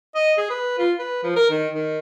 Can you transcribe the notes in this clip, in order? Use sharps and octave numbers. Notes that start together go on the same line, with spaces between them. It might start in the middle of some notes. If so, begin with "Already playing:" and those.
D#5
G#4
B4
F4
B4
F3
A#4
D#3
D#3